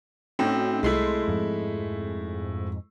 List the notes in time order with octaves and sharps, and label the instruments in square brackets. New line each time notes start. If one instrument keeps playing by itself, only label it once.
[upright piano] A2 C4 [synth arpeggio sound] C#4 D#4 F#4
[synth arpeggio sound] C2 C6 [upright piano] G#3 A3 E4
[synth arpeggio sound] F2 G#2